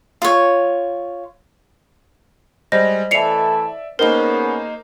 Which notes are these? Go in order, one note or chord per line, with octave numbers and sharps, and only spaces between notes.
F4 C#5
G3 G#3 C5 D#5 A#6
E3 A3 A4 D5 E5 C7 C#7 F7
A#3 B3 C#4 D#4 G#4 A#4 C5 G7